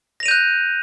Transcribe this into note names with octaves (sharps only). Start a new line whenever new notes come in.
F#6 G6 A#6 D#7 F7